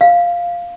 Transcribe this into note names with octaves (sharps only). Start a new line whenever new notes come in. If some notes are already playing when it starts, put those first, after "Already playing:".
F5